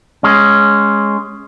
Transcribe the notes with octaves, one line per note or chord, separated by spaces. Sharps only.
G#3 C#4